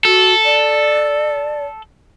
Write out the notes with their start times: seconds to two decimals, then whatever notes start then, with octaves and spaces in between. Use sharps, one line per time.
0.05 F#4 A4
0.44 D5